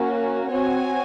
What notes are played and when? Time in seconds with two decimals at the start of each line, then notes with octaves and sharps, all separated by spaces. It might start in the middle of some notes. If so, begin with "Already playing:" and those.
Already playing: A#3 C#4 F#4
0.52 C4 F#4 C#5 G#5